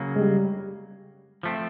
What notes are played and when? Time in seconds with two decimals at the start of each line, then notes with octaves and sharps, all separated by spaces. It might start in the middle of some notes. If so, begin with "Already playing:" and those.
Already playing: C#3 F#3 A#3
0.16 G#3
0.20 G3
1.43 F3 A3 C4